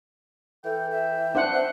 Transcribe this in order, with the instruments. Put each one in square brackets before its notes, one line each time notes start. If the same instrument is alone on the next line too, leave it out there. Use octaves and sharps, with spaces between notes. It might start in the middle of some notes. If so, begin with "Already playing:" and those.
[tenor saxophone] E3 [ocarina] A4 [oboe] G5
[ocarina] E5
[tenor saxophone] C4 [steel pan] D4 C5 F#5
[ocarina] E5